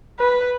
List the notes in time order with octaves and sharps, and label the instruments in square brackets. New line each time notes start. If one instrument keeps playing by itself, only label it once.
[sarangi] B4